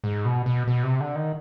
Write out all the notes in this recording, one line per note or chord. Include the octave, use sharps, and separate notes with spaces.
G#2
B2
B2
B2
C3
D3
D#3